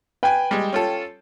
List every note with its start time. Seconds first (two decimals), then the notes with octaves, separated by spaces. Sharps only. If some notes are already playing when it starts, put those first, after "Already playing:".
0.23 B4 G5 G#5
0.51 G3 G#3
0.73 C#4 F4 A4